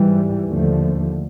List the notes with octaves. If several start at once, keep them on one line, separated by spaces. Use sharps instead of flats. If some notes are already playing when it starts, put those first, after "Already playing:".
Already playing: G#2 E3 G3
D#2 D3 F3 A3